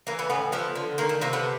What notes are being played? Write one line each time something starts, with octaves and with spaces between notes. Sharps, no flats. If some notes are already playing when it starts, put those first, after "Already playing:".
E3 A#3
A3 B3
A2 B3 C#4
F3 A3 B3
D3
D#3 A#3
A3
C3 A#3
A3 B3